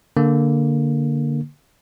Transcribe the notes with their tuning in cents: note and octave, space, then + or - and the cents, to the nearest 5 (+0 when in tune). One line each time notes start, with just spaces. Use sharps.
D3 -5 A#3 +0